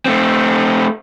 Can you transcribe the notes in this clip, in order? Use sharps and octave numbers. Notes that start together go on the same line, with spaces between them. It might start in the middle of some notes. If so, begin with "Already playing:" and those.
A3 C4